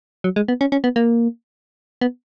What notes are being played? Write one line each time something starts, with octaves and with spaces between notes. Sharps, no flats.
F#3
G#3
B3
C#4
C#4
B3
A#3
B3